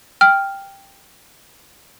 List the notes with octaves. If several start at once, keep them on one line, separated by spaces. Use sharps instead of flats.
G5 F6